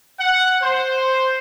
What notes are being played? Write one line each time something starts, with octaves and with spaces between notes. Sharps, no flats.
F#5
C5